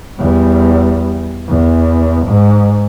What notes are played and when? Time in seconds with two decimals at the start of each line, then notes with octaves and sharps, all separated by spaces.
0.19 E2 G3
1.49 E2
2.27 G#2